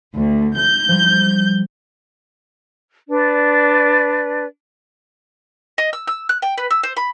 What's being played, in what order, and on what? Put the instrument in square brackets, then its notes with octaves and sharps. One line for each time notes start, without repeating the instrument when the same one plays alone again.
[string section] D2
G6
[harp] F3 G3
[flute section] D4 B4 D5
[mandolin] D#5
E6
E6
F#6
G5
B4
E6
C5
B5